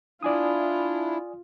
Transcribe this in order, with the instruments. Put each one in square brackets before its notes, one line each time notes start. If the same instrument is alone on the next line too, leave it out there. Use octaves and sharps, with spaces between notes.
[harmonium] D4 E4 [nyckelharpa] F4 [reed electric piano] D5 G#5 D#6